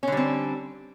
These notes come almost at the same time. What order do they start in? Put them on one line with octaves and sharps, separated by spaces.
C#4 D3 G3 C4